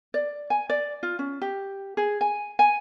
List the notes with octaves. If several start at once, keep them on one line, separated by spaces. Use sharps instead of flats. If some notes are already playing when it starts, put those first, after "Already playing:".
D5
G#5
D5
F4
C#4
G4
G#4
G#5
G#5